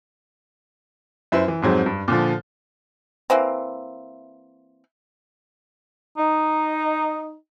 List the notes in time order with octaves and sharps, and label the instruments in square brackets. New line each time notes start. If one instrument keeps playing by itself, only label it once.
[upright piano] F#2 E4 B4 C5
E3
F2 G#2 F#3 C4
G2
A#2 D3 F3
[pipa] E3 A#3 C4
[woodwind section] D#4